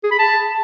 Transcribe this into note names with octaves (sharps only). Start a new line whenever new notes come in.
G#4
B5
A5